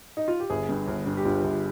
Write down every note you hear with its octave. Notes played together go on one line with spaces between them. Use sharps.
D#4
F4
G4
G1 G#4
G2
G1
G2
G4
G2 F4
G1